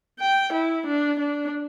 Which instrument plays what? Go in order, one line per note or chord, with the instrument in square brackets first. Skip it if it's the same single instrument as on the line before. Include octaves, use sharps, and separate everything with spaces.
[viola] G5
E4
D4
D4